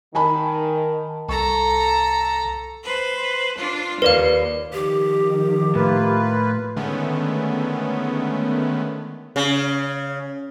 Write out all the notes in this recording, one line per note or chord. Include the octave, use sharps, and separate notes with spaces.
D#3 G#5 A5 B5
C2 A4 A5 A#5 C#6
B4 C5
D4 F4
D#2 A#4 B4 D5 F5
D#3 F3 G4
A2 A#3 F4 B4
D3 D#3 G#3 A3 B3 C#4
C#3